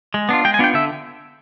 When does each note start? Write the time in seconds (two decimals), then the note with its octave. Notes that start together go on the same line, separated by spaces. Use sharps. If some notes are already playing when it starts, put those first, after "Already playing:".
0.14 G#3
0.29 B3 D4 F4
0.45 G#3 G5
0.54 G#5
0.59 B3 D4 F4 G5
0.74 D3 E5